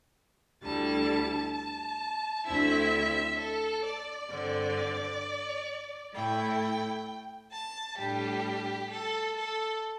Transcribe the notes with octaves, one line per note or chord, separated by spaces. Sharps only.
D2 D3 G3 E4 A5
A5
D2 D3 C4 E4 E5
A4
D5
G2 D3 C4
A2 A3 E4 G5
A5
A2 G3 D4 G4
A4
A4